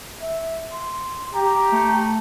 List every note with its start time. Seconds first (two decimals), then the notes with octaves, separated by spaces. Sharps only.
0.21 E5
0.72 C6
1.33 G4 A#5
1.72 A3